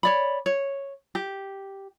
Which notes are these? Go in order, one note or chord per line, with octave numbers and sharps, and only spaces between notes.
C#5 D5 B5
C#5
G4